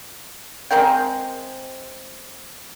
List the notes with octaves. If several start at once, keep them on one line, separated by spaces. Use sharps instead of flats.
G#3 C4 A#4 G5